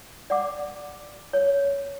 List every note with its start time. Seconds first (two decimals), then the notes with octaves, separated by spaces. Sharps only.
0.30 D5 F#5 D6
1.33 C#5